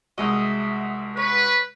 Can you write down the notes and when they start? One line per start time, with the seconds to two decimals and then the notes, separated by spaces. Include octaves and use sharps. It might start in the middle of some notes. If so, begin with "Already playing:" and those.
0.18 C2 G#3 F#4 D#5 E5
1.17 B4 C#5